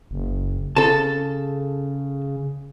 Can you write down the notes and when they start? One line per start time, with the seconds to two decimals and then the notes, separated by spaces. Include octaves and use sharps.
0.11 F#1
0.76 C#3 A4 A5